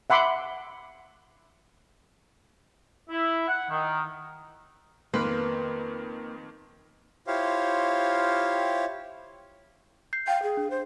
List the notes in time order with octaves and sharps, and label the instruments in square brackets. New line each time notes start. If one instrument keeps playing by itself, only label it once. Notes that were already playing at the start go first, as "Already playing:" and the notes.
[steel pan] E5 F#5 B5 C6 D6
[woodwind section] E4
F#5
D#3
[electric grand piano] F2 D#3 C6 [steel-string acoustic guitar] A#3 [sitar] B4
[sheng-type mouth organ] E4 F4 G4 C5 C#5 F5
[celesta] G6 C7
[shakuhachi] F5 [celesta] G5
[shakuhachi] G#4
[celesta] D4
[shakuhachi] C5